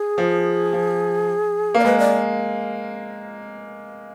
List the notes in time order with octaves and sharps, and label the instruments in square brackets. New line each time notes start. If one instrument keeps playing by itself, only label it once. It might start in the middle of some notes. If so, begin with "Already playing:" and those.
Already playing: [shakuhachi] G#4
[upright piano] F3
F3
[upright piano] A#3 [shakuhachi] D5
[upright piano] G#3 [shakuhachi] B4
[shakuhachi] D5